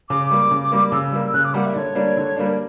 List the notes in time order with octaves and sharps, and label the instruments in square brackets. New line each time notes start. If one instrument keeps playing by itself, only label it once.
[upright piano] C#3 [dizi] D6
[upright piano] G3 A#3
C#3
G3 A#3
[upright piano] C#3 [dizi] E6
[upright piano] G3 A#3
[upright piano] C#3 [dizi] F#6
[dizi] D6
[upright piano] G3 A#3 [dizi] F#5
[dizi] E5
[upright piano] D3 [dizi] C#5 D5
[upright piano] G3 A#3 D4
D3
G3 A#3 D4
[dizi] A#4